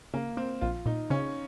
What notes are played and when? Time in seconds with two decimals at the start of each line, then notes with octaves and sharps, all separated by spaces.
0.14 C#3 A#3
0.37 A#3 C4
0.61 A#1 F4
0.86 A#2 D#4
1.10 C#3 C#4